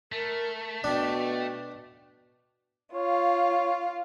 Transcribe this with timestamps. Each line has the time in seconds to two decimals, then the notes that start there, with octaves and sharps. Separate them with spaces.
0.12 A3 A#4
0.84 B2 D4 G5
2.94 F4 C#5 F5